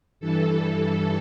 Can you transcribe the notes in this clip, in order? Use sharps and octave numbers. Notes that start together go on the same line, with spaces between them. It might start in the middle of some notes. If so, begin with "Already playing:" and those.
G2 E3 A4